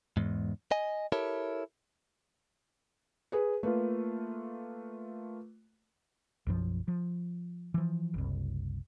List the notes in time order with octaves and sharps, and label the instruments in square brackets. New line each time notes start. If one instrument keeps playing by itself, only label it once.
[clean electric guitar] E2 G#2
D#5 G#5
E4 G4 A4 A#4 C#5
[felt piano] G#4 B4
[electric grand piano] A3 A#3 F4 [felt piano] B4
[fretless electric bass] B1 F#2 F3
F3
E3 F3
F#1 C2